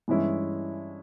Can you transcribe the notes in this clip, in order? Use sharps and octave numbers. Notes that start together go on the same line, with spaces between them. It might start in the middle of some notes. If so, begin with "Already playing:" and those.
G2 E3 G#3 C#4 E4